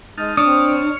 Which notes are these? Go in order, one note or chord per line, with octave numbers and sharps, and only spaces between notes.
G#3 D#4 A5 F6
C4 D4 C#5 C#6 D#6 F6